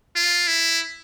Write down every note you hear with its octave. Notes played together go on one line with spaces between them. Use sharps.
F4
E4